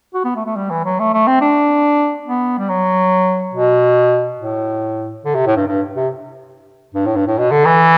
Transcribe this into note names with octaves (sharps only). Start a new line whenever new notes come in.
F#4
B3
A3
A3
G3
E3
F#3
A3
A3
C4
D4
B3
G3
F#3
B2
A2
D3
C3
A2
G2
G2
C3
G2
A2
G2
A2
B2
D3
E3